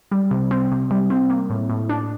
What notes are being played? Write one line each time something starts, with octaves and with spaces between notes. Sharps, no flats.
G3
C3
C4
C3
G3
C4
A#3
A2
A2
D4